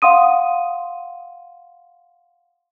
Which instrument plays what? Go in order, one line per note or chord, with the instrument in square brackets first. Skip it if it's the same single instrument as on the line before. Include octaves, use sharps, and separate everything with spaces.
[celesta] F5 F#5 C6 D#6 D#7